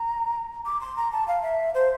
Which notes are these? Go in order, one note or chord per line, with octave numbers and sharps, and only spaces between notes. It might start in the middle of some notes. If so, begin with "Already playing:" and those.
Already playing: A#5
D6
C6
A#5
A5
F5
E5
C5